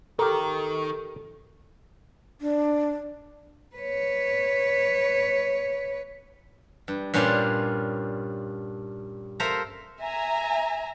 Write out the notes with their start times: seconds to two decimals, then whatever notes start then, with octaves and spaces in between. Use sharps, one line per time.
0.19 D#3 G4 A4 A#4
2.41 D4
3.76 B4 C#5
6.88 G2
7.14 G2 A#2 C#4 D4 F4 C5
9.40 A4 A#4 C5 E5 F5 A#5
10.00 E5 G#5 A#5